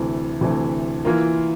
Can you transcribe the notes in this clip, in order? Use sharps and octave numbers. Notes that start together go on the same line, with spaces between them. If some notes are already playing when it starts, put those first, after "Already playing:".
Already playing: D2 C3 E3 A3
D2 C3 E3 A3
E3 A#3 F4 A#4